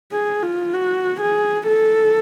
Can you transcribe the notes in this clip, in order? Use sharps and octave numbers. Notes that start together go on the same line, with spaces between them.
G#4
F4
F#4
G#4
A4